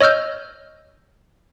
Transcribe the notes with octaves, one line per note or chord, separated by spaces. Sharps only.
C#5 D#5 E6 F6 G6